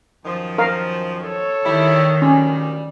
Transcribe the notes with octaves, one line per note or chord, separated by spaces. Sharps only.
F#2 D#3 F3
A#4 F5
A4 C#5
D#3 G3 E4
D2 A#2 G3 C#4